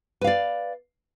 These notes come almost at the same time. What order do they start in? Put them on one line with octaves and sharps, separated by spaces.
B4 F5 D5